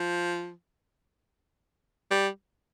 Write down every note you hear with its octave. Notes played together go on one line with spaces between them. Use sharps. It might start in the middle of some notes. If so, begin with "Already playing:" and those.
Already playing: F3
G3